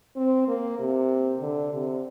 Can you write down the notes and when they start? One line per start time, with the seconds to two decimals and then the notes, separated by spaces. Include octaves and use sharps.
0.16 C4
0.48 A#3
0.79 C3
1.41 D3
1.72 C3